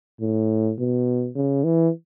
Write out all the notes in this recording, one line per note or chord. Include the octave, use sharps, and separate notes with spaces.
A2
B2
C#3
E3